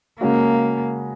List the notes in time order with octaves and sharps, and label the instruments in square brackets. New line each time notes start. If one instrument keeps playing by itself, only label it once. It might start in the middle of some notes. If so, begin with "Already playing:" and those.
[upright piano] C#3 G#3 C#4 F#4 [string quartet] A#3